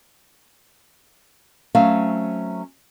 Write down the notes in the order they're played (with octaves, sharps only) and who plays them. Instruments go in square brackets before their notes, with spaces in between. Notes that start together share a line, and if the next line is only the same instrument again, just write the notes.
[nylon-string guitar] F#3 A3 C4 C#4 F5